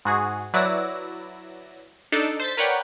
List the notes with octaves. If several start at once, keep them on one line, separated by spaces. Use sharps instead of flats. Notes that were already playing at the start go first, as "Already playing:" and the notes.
G#2 F#4 G#4
F#3 E4 B4 D5 E6 A#6
D4 D#4 A4 D5
C5 A6 B6
A#4 B4 C#5 D5 F#5 G5